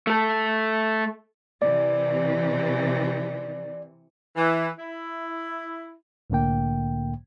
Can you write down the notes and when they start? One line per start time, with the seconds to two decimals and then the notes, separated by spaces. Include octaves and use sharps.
0.07 A3 A4
1.62 C3 E3 D5
4.36 E3
4.78 E4
6.30 C2 A2 D3 A#3 G5